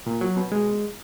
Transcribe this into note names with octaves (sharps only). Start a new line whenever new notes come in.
A#2
F#3
B2
G#3